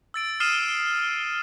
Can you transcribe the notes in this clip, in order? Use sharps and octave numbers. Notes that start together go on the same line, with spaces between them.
E6 A6 D7
D#6 F6 C7 D#7 E7 G7